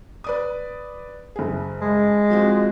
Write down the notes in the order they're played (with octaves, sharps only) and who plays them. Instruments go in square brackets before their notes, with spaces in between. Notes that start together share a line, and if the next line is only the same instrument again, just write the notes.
[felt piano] B4 D5 D#6
F#1 G#4
[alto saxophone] G#3
[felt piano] F3 C4 F#4